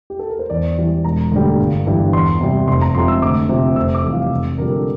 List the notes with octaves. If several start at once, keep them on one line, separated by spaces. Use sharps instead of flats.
G4
A4
A#4
C5
E2 D5
E3 G3
E1 A#5
D2 D3 G3
G1
G2 E3 G3
E2 C6
C3 G3
F1 C6
A#5
F2 C3 C6
E6
D2 D6
C3 F3
F1 E6
D6
F2 E3 G3
F5
F1
F2 D3 G3 A#4
A4